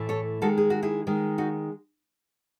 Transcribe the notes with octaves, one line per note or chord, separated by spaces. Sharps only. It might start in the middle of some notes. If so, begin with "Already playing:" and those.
Already playing: A2 E3 A3
A4 C#5
D#3 G#3 F#4 A4
G#4
F#4
E4 G#4
D#3 G#3
D#4 F#4